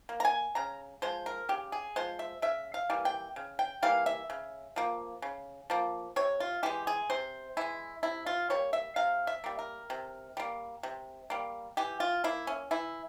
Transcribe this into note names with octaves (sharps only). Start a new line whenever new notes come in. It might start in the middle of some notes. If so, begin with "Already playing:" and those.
A#3
A#5
G#5
C#3 A#5
F3 G#3 C5
A#4
C#3 G4
G#4
F3 G#3 C5
E5
C#3 E5
F5
E3 G3 A#3
G5
C#3
G5
E3 G3 A#3 F5
E5
C#3
F3 A#3
C#3
F3 A#3
C3 C#5
F4
E3 G#3 G4
G#4
C3 C5
E3 G#3 E4
C3 E4
F4
G3 A#3 C#5
E5
C3 F5
E5
G3 A#3
A#4
C3
G3 A#3
C3
G3 A#3
E3 G4
F4
A#3 E4
C#4
E3 E4